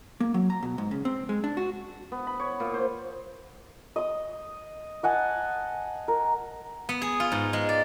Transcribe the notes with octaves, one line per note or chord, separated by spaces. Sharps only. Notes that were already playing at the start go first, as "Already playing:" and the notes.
A#3
F#3
A#5
B2
G#2
C#3
C4
G#3
D4
F#4
B3
B5
C#5
A#2
C5
D#5 D#6
D#5 F#5 G#5 A5
A#4
B3
G#4
F4
G#2
G#3
D5